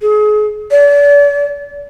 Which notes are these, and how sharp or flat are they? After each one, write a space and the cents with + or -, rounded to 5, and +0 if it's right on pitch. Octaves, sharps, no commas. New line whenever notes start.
G#4 +35
D5 -40